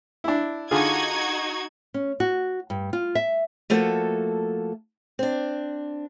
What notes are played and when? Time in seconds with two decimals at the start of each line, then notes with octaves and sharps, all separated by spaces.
0.24 D4 E4
0.71 D3 D#4 F4 F#4 G#4 G#6
1.94 C#4
2.20 F#4
2.70 G2
2.93 F4
3.15 E5
3.70 F3 A3 A#3 F#4 A4
5.19 C4 D4